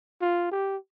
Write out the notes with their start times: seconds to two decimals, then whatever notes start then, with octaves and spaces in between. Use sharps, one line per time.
0.21 F4
0.51 G4